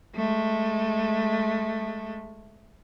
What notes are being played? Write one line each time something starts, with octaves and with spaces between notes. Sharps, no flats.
G#3 A3